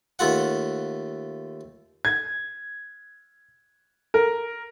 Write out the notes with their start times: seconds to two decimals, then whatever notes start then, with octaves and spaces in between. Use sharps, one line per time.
0.19 D#2 A3 F4 F#5
2.05 G#6
4.14 A#4